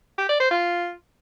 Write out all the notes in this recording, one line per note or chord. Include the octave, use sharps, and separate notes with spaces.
G4
D5
C5
F4